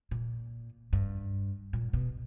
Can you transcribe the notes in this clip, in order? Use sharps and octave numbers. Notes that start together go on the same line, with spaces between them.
A#2
G2
A#2
B2